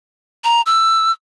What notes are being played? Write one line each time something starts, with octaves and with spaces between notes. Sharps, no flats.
A#5
E6